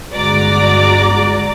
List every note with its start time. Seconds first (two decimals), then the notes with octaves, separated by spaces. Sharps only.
0.12 G1 G#3 F#4 D5 A#5 D6